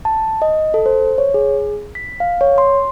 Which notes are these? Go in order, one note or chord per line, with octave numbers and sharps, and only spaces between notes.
A5
D#5
A4
C5
C#5
G#4
B6
F5
C#5
C6